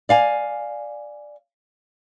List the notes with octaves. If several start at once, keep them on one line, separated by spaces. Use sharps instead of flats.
D5 F5 G#5